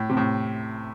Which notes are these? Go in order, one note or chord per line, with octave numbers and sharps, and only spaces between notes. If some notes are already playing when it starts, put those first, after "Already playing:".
Already playing: A2
C3
A2